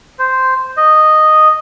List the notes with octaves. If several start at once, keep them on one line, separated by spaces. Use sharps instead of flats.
C5
D#5